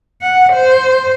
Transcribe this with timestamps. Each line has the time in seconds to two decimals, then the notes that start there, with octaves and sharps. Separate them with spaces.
0.22 F#5
0.53 C5